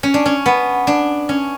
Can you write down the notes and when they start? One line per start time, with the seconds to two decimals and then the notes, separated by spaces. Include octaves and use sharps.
0.03 C#4
0.14 D4
0.26 C#4
0.46 B3
0.87 D4
1.29 C#4